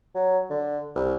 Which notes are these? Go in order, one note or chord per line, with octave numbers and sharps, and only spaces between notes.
F#3
D3
C2